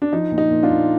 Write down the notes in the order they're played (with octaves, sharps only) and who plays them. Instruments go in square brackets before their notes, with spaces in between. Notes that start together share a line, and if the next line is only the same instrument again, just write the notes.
[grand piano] D4
F3 D#4
A#2
D#4
A#2
D4 F4
A#2